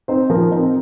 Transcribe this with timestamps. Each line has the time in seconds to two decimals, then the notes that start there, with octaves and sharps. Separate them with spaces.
0.08 C4 D#4 C5
0.30 F3 A#4
0.51 C4 D#4